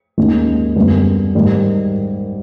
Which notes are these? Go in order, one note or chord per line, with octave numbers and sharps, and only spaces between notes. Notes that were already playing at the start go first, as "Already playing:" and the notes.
D#2 D#3 G#3 C#4
F#2 D3 G3 B3
G#2 D#3 G3